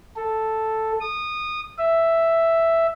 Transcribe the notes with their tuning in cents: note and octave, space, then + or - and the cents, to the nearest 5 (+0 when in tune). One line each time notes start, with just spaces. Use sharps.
A4 +0
D#6 -20
E5 +5